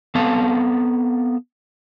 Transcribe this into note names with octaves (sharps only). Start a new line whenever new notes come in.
B3 C4 A4 F5 A5